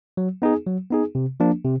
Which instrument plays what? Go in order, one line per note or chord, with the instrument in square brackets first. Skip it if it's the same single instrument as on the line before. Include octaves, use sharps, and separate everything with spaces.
[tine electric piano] F#3
B3 D#4 G#4
F#3
B3 D#4 G#4
C3
F3 A#3 D4
C3